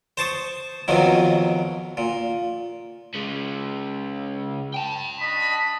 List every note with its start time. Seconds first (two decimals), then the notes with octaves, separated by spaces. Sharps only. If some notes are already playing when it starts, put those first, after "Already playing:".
0.17 C5 A5 C#6 D#6
0.88 F2 B2 D#3 F#3
1.97 A#2
3.15 C#3 G#3
4.74 G5 A5
5.20 D4 D#5 B5